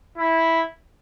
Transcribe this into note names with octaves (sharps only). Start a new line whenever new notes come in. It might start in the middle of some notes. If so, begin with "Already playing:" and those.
E4